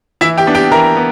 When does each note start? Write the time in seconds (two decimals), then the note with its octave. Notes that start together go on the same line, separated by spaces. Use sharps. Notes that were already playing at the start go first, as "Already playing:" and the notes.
0.21 E3 E4 E5
0.37 G4 G5
0.47 B3 D4
0.55 G4 G5
0.72 E3 A#4 A#5
0.97 B3